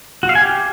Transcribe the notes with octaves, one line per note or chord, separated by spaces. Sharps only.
F#4
F5
G#5
G4